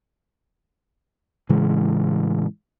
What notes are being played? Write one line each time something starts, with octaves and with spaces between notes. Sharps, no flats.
A2 C#3 E3 G#3